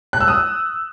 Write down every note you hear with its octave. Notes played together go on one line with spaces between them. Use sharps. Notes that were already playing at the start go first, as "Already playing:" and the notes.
F#6
E6
D#6